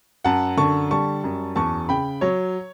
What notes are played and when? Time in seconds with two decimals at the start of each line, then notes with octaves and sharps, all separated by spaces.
0.25 F#2 F#5 A5
0.57 D3 A5 C#6
0.90 G3 A5 C#6
1.24 F#2
1.56 E2 A5 C#6
1.89 C#3 G5 B5
2.21 F#3 C#5